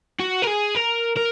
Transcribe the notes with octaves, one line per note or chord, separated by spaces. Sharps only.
F#4
A#4
G#4
A#4
A#4